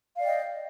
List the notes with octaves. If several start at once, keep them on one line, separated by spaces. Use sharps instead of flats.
D5 D#5 F5 G5